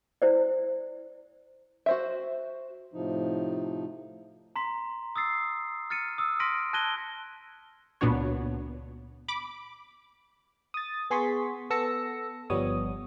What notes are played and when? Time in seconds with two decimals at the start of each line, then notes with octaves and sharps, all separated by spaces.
0.22 E4 C5 D5
1.86 F#4 C5 E5
2.94 A2 C3 F3 D#4
4.56 A#5 C6 B6
5.16 D#6 E6 A6 C7
5.90 F6 A6 C#7 D#7
6.18 D#6 E6
6.40 C6 F6 A#6 B6 D7 D#7
6.73 A5 F#6 G#6 A#6 D#7 G7
8.01 C#2 A#2 B3 D4 F#4 C#5
9.28 B5 D6
10.74 D#6 A6
11.10 B3 G#4 C6 C#6 B6
11.70 B3 A4 E6 A#6 C#7
12.50 G1 F3 G3 B3 C#5 D#6